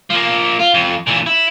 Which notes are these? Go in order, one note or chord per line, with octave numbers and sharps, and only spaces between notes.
F3 A#3
F4
F2
A#2 E3
E4